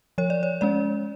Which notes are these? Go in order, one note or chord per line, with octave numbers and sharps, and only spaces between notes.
F3 C#5
D5
C#5
G#3 C#4 D5